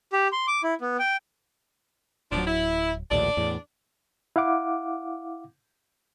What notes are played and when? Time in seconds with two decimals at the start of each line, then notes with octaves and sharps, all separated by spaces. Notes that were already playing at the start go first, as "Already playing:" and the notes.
0.13 G4
0.32 C6
0.48 D6
0.64 E4
0.81 B3
0.99 G5
2.32 D1 F3 F#3 D4
2.47 E4
3.11 A#1 D#2 A2 D4 D5
3.37 E2 A2
4.36 E4 F5 F#5 D6